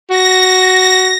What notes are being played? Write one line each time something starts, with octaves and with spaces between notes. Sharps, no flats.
F#4 A#6